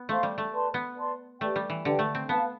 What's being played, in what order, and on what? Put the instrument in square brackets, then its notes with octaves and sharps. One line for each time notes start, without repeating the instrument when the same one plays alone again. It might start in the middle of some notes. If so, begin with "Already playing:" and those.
Already playing: [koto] B3
[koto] A3 [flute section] C5 F5 C6
[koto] G3
A3
[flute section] B4 D5 A5 C6
[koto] B3
[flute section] B4 D5 A5 C6
[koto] A3 [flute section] G4 B4 D5 G5
[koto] G3
E3
[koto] D3 [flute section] G4 B4 D5 G5
[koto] A3
C4
[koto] B3 [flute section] B4 F5 A5